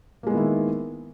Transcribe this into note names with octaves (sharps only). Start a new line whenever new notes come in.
D#3 G#3 A#3 B3 E4